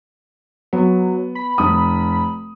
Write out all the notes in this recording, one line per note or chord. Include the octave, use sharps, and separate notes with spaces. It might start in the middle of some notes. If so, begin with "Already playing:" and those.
F#3 B3
B5
F1 D#6